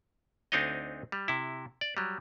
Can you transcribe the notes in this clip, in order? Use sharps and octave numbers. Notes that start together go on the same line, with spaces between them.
D2 C4 D4 D#4 C#5 D#5
G3
C3 E4
D5
F#3 G3